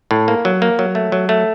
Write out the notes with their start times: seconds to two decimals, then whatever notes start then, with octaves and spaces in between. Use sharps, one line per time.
0.11 A2
0.28 A#3
0.45 F#3
0.62 A#3
0.79 F#3
0.95 A3
1.12 F#3
1.29 A3